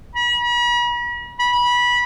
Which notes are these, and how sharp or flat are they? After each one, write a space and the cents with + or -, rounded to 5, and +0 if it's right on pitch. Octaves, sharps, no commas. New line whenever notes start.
B5 -45
B5 -20